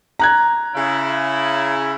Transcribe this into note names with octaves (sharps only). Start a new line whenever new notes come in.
A#5 F#6 G#6
C#3 E4